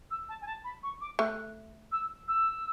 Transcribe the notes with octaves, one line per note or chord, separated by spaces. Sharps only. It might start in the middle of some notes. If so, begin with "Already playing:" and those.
E6
A5
G#5
A5
B5
C#6
D6
A3 F#6
E6
E6